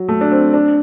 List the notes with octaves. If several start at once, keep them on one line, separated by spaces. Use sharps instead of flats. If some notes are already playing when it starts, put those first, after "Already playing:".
Already playing: F#3
A3
D4
C4
D4